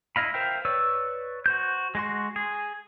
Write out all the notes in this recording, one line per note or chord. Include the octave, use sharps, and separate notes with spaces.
E4 D#5 F5 B5
A#4 C5 E5 F5 G5
B4 C#5 D5 E6
F#4 C5 G6
G#3 F#4 C6
G#4